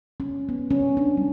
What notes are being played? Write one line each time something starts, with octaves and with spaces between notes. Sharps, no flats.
C#4
B3
C#4
D4
G3